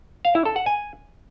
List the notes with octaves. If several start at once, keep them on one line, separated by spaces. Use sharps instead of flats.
F5
E4
A4
F#5
G#5